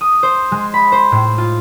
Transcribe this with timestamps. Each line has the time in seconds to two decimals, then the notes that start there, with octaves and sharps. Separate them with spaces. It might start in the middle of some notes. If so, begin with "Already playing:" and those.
0.01 D#6
0.23 C5
0.52 G#3
0.74 B5
0.92 C5
1.12 A2
1.38 F4